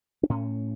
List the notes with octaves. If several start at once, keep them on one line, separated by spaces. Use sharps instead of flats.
D4
A2 C#4